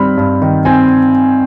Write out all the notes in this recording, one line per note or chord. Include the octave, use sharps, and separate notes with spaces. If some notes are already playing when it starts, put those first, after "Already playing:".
Already playing: G2 D#3 G3 C4 B5 F6
G2
D#3
C4 G#5